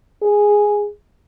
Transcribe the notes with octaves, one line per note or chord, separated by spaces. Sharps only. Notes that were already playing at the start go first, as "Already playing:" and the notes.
G#4